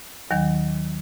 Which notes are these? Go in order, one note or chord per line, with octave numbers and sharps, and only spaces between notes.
D#2 D#3 F#3